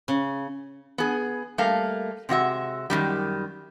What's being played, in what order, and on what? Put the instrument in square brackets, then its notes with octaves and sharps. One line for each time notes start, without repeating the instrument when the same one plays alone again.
[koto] C#3
[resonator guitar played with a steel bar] B3 G#4
G3 A3 A#3 F5
C3 G#3 F#4 E5
F#2 C3 D#3 G3